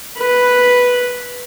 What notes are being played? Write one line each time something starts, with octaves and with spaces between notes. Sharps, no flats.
B4